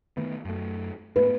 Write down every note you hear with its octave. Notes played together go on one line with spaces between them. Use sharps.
D#3 A3 B3
F#2 A3
G#2 A3 B3 B4